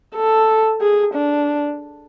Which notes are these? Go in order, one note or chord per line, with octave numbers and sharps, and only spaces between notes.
A4
G#4
D4